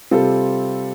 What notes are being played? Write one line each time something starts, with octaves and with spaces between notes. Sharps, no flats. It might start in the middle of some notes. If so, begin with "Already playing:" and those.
C3 G3 C4 F4 A4